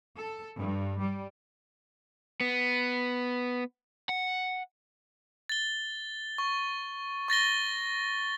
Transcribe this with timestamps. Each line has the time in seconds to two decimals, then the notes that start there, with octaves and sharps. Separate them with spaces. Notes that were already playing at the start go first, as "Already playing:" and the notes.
0.17 A4
0.58 G2
0.99 G3
2.41 B3
4.09 F#5
5.49 A6 G7
6.38 C#6
7.28 C#6 A6 A#6 G7